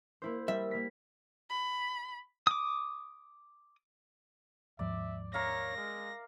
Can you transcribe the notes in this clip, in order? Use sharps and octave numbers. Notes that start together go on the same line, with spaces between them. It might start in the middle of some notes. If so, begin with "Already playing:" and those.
A#3 E4 C5
G3 E5
A#3 B6
B5
D6 D#6
D#2 G#2 F3 D5 E5
A#4 C#5 E5 F5 A#6
G#3